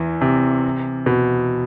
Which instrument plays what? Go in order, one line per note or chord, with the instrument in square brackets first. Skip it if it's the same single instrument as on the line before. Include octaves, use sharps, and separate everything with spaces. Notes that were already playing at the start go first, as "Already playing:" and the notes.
Already playing: [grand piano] E2 E3
C3
B2